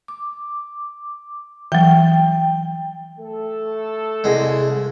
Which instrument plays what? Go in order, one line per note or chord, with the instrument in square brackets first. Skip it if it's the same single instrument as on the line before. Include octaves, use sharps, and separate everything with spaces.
[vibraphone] D6
[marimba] E3 F#3 [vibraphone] G5
[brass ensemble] A3 A4
[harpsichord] C2 G#3